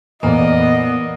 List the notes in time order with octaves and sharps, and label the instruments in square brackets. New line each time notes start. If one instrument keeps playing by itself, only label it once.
[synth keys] F2 A#2 E3 [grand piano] A#3 D5 [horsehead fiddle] B3 [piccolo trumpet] D#5